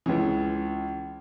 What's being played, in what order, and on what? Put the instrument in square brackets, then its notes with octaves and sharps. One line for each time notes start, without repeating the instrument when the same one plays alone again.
[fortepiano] C#2 C#3 E3